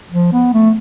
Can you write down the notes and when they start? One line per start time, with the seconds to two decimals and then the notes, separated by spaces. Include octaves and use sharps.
0.12 F3
0.33 B3
0.54 A3